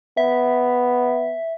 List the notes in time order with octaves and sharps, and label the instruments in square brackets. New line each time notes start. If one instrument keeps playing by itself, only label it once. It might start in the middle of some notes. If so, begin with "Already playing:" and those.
[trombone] B3 [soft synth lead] E5